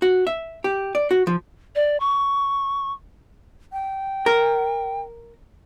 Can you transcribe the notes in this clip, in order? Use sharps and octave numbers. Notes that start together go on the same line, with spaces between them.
F#4
E5
G4
D5
F#4
F3
D5
C#6
G5
A#4